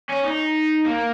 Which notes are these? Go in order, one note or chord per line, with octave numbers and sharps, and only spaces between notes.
C#4
D#4
A#3